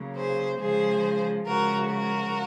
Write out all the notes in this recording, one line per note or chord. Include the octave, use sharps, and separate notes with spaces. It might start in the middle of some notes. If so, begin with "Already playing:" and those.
Already playing: C#3 F#3 A#3
G#4 C5
C#3 F3 G#3 G#4 C5
C#3 F3 G#3 F#4 A#4
F#4 A#4